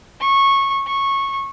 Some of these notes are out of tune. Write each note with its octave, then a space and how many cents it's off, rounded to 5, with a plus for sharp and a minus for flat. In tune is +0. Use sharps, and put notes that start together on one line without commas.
C#6 -15
C#6 -15